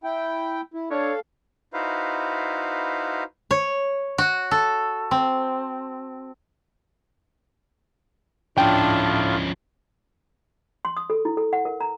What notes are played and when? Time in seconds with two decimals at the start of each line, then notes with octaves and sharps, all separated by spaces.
0.04 E4 G5
0.74 E4
0.90 D4 A4 C#5 F5
1.73 D#4 E4 F#4 B4 C5 F5
3.51 C#5
4.18 F#4
4.51 A4
5.11 C4
8.58 A2 F3 C#4 D4 F4 G5
10.85 C6
10.97 D#6
11.10 A4
11.25 E4
11.37 A4
11.53 F#5
11.65 A#4
11.80 A#5